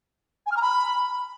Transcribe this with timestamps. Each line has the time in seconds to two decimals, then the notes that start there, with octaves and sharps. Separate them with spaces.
0.46 G#5
0.51 F6
0.56 A#5
0.62 B5